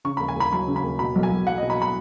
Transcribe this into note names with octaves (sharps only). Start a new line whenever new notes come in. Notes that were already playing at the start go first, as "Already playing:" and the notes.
C#3 C#6
D#2 B5
G#5
D#2 B5
F#3 B5
C#3
B5
D#2
B2 B5
B1
G#5
B1
F#3 F#5
D#5
B2
B5
B5